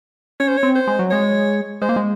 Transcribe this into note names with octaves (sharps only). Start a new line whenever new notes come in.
C#4 C#5
C5
C#5
C4
C5
G#3
F#3
G#3 C#5
G#3 C5
A#3
G#3